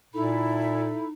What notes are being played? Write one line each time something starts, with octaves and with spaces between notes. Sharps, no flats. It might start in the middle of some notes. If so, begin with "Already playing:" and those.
A#2 D#4 E4 A4 B5